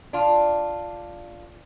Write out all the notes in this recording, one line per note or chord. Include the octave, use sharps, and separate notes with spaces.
D4 F4